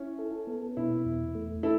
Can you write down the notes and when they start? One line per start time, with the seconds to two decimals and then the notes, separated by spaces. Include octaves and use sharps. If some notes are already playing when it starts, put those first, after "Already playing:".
Already playing: C#4 E4
0.19 A4
0.47 B3
0.77 B2 E4
1.05 E2
1.35 A3
1.63 E4 A4